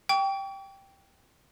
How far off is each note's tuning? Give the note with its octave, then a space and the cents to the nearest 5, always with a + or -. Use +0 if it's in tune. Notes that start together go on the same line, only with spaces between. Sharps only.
G5 +0 C#6 +45